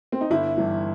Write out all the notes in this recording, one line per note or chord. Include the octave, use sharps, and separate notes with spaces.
C4
D#4
G1 E4
G2 E3